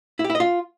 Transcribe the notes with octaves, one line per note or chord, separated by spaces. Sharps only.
E4
G4
E4
D#5
F4